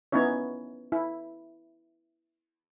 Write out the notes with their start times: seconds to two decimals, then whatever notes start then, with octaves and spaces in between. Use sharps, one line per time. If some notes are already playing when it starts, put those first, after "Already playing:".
0.12 B3 C#4 D#4 E4 C#5
0.92 E4